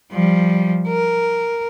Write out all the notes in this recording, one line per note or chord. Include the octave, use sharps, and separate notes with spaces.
F3 G3
A#4